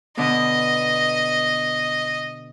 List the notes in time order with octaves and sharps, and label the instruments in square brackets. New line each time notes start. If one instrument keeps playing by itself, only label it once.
[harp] B2 D3 B3 [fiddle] D#5